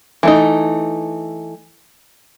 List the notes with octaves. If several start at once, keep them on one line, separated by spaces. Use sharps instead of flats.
E3 A3 D#4